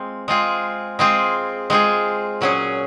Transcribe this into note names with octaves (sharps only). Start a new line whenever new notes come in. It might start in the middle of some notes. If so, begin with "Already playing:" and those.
Already playing: G#3 C4 F4
G#3 C4 F4 G#4
G#3 C4 F4 G#4
G#3 C4 F4 G#4
A#2 F#3 C#4 G#4